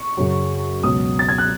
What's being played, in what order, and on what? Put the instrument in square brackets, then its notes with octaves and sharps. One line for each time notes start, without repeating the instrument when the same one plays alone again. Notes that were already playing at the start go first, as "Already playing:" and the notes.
Already playing: [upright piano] C#6
F#2 C#3 F#3
C#2 B2 F#3 D#6
A6
G#6
F#6